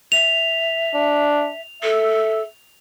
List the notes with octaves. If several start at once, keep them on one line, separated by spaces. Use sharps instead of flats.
E5 F7
D4
A4 E5